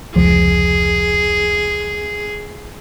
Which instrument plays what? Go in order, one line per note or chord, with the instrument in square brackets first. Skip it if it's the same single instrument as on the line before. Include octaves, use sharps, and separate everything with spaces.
[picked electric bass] F1 C#2 F3 [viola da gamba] G#4